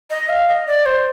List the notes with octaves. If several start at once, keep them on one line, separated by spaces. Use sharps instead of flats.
D#5
F5
D#5
D5
C5